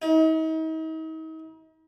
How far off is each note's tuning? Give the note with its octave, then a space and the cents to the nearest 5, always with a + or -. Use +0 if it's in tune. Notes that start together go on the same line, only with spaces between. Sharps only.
D#4 +40